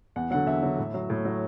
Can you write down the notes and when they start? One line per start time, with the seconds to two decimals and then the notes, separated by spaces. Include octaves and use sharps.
0.16 E2 F#5
0.30 D3 F#3 F#5
0.47 E2 E5
0.63 D3 F#3
0.78 A2
0.94 F#3
1.10 A2
1.25 F#3